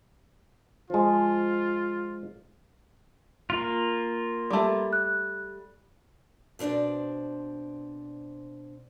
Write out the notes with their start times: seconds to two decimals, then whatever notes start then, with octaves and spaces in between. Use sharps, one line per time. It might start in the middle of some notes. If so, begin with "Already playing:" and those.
0.90 F3 G#3 F4
3.50 A#3 F4
4.51 G3 A3
4.93 F#6
6.59 B2 C4 D4 C5 D5